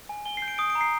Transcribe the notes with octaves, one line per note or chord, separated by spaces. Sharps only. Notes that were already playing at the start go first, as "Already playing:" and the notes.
G#5
G#5 G7
C7
G6
D7
D#6 D7
D7
A#5
C7